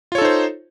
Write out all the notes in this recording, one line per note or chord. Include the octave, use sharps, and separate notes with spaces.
D#4 F4 A4 C5 C#5